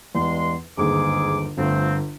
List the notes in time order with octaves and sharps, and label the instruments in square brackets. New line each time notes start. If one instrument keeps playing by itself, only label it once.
[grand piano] E2 [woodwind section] G2 G#3 C6
[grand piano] G1 D#2 [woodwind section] G#2 G#4 D6
[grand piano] G1 [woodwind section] F3 A3 C4